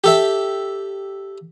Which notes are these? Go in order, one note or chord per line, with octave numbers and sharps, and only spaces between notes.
G4 A4 E5